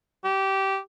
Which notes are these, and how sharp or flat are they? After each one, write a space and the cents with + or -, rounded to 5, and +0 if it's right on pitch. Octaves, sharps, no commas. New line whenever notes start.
G4 -20